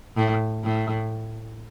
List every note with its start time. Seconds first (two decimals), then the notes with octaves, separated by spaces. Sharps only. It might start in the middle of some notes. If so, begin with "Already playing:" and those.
0.17 A2
0.64 A2